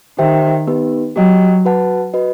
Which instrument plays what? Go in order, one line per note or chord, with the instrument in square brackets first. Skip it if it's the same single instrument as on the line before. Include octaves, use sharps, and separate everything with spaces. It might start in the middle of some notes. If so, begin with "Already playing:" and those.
[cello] D#3 [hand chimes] G4 C5 E5 G5
[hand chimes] B3 D#4 G4 B4
[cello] F#3 [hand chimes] G4 D#5 G5
[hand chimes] F#4 B4 F#5 A5
F#4 B4 D#5